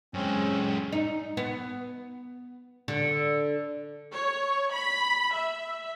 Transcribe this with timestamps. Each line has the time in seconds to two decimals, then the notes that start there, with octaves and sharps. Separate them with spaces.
0.14 F#2 G#3 C4 C#4
0.92 D#4
1.37 B3
2.88 D3
4.12 C#5
4.73 B5
5.34 E5